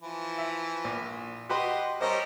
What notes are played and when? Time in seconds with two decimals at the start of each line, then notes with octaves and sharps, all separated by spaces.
0.02 E3 F3
0.38 E5
0.84 A#1
1.49 F#4 G4 B4 D#5 C6
2.01 G3 C#4 A#4 C5 D#5